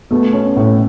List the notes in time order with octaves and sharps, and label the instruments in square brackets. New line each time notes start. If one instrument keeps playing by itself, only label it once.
[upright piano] B2 B3 [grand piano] A3
[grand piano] C#4
A2